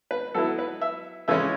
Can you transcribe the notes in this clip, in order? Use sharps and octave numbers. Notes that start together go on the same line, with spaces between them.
B4
F#3 B3 E4 A4
B4
E5
C#3 E3 G#3 C#4 E4 E5